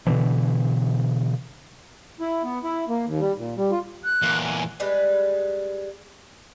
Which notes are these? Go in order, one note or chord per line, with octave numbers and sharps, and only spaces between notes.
B2 D3 E3
E4
B3
E4
A#3
D#2
G3
A#2
G3
F4
F#6
E2 A#2
G#5
G3 G#3 B4